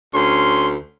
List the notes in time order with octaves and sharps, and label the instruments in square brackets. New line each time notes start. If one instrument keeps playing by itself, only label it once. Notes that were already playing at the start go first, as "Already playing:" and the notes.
[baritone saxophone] D2 [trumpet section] C#4 C6